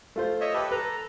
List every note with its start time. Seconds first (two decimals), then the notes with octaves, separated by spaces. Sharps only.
0.16 A3 F4 C5
0.41 C#5 D#5 E5
0.54 G4 A4 B4
0.72 A4 B4 A#5